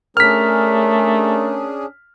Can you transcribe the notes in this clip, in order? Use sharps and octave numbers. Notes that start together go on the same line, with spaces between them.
A3 C#4 D4 G#4 A#4 F6 B6